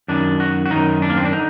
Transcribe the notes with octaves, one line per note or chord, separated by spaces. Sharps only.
F#2 D#3 D4
F#4
F#4
F#2 D#3 D#4
D4
A#3
C4
D4
D3 D#4